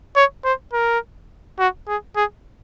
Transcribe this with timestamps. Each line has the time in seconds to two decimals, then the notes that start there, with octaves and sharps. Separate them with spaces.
0.16 C#5
0.45 C5
0.73 A#4
1.59 F#4
1.88 G#4
2.16 G#4